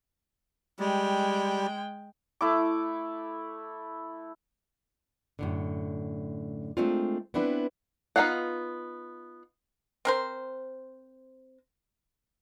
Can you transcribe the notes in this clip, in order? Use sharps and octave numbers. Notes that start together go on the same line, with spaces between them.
G3 G#3 G5
A3 E4 D6
F#2 A2 D3
G#3 A3 C4 D4 F4
B3 C4 D4 E4 B4
B3 D#4 F4 F5 F#5
C4 A#4 C5